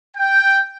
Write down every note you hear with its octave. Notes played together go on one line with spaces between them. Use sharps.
G5